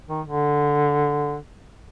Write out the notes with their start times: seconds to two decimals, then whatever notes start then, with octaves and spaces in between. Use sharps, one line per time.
0.09 D#3
0.26 D3